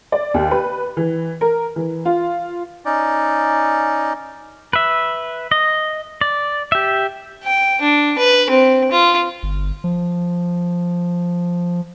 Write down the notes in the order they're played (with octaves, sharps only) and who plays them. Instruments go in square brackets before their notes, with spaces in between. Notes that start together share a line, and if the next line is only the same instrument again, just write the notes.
[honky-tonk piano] D5
D#2
B4
E3
A#4
E3
F4
[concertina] C#4 D#4 D5
[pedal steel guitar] B4 E5
D#5
D5
G4 E5
[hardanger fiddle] G5
D4
B4
C4
F4
[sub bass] G1
F3